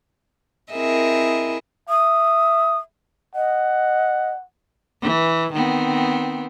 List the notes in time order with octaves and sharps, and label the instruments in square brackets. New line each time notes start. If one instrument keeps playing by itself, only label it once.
[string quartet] C4 E4 G#4 A#4 D#5 E5
[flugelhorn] E5 [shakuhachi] D#6
[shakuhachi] D#5 [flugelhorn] F#5
[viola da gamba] E3
D#3 B3 C4